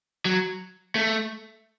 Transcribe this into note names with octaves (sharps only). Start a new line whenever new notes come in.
F#3
A3